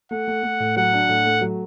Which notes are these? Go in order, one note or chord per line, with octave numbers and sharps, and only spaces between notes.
A3 F#5
A3
A3
A2
F#3 F#5
D4
A2
A3
F#3